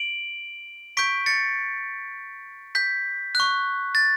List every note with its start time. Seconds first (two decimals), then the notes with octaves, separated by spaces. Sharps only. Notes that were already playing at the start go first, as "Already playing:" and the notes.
Already playing: D7 F#7
0.97 C#6 G6 B6 D7
1.26 A6 C#7
2.75 G6 B6
3.35 C#6 F#6
3.95 A6